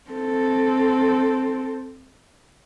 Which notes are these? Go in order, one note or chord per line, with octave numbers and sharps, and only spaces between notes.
C4 A4